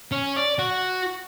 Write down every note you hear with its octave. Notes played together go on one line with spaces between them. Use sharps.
C#4
D5
F#4